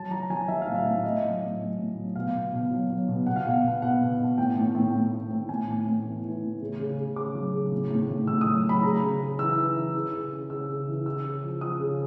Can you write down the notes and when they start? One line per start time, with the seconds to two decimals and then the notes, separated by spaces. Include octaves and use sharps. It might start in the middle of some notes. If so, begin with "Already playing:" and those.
Already playing: F#3 A5
0.11 F#3 A#5
0.30 F#3 G#5
0.48 F#3 E5
0.62 F5
0.67 A2
0.75 E5
0.86 A2
1.04 A2 D#5
1.23 F#3
1.41 A2
1.60 F#3
1.78 A2
1.97 F#3
2.16 B2 F5
2.34 B2
2.52 B2
2.71 F#3
2.90 F#3
3.08 B2
3.26 B2 F#5
3.36 F5
3.45 B2 F#5
3.64 B2
3.82 B2 F#5
4.01 B2
4.19 B2
4.38 A2 G5
4.57 A2
4.75 A2
4.94 A2
5.12 A2
5.30 A2
5.49 A2 G#5
5.68 A2
5.87 A2
6.05 E3
6.24 E3
6.42 A2
6.61 C#3
6.79 C#3
6.97 C#3
7.16 C#3 D6
7.35 F#3
7.53 C#3
7.72 A2
7.90 A2
8.09 A2
8.27 A2 E6
8.41 F#3 D#6
8.64 F#3 B5
8.83 C#3 A#5
9.02 C#3
9.20 C#3
9.39 E3 E6
9.57 E3
9.76 E3
9.95 C#3
10.13 C#3
10.32 C#3
10.50 C#3 E6
10.69 C#3
10.87 E3
11.06 C#3 E6
11.25 C#3
11.43 F3
11.61 F3 D#6
11.80 C#3